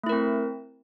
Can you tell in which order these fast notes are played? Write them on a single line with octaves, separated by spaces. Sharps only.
A3 E4 A#4 C4